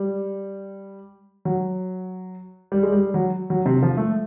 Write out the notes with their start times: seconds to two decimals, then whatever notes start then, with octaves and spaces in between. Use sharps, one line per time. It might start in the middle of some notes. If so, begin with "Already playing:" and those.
Already playing: G3
1.45 F#3
2.72 G3
2.83 G#3
2.92 G3
3.14 F#3
3.50 F#3
3.66 C3
3.82 F3
3.97 A3